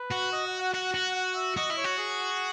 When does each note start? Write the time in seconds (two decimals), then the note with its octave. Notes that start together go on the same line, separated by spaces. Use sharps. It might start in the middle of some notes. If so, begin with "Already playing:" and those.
Already playing: B4
0.11 F#4
0.32 D#5
0.46 F#5
0.59 F#5
0.74 F#4 F#5
0.94 F#4
1.16 F#5
1.35 E5
1.57 F#4 D#5
1.70 E4
1.77 C#5
1.84 F#4
1.98 G#4